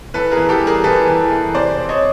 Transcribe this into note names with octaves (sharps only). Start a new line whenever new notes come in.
E3 A4 B4
G#4 A#4
E3
G4 A4
G3
G#4 A#4
E3 A4 B4
E3
E3
C3 C5 D5
C4
C#5 D#5